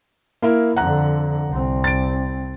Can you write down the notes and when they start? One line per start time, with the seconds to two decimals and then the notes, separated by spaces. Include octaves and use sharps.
0.42 A#3 E4 A#4
0.76 F2 D3 F#5 A#5 F#6
1.49 C2 C4
1.84 A6 D7